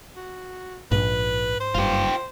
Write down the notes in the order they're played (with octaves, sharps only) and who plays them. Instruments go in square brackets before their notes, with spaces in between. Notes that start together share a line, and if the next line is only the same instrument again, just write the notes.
[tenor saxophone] F#4
[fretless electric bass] A#1 [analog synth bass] G#2 [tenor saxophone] B4
[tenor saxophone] C5
[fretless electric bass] F#1 G2 [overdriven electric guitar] F4 G4